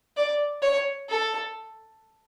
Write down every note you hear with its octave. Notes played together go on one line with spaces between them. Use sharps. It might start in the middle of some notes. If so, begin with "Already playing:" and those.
D5
C#5
A4